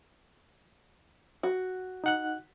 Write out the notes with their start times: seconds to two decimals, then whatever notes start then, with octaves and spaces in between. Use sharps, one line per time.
1.43 F#4
2.04 D#4 F#5 F#6